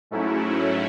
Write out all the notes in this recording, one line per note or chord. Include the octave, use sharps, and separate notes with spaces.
G#2 F#3 A3 C#4 E4